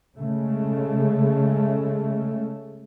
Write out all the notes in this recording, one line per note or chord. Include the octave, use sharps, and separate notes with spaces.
C#3 G#3 A3